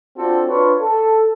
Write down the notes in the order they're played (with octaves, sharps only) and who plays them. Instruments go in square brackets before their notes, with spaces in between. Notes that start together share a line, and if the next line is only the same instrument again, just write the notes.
[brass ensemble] C4 D4 F4 F#4 A4
D4 F4 B4 C#5
A4